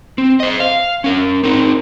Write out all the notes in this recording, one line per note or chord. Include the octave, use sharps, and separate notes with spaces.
C4
C5 D#5
F5
C#4 A#4
C4 D#4 A#4